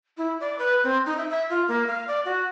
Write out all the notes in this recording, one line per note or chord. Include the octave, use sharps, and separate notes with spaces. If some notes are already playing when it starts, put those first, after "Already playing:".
E4
D5
B4
C4
D#4
E5
E5
F4
A#3
F5
D5
F#4